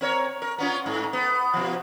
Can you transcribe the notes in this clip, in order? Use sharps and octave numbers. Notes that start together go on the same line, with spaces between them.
C4 A#4 C#5
A#4
B3 C#4 F4
G#2
B3
B2 F3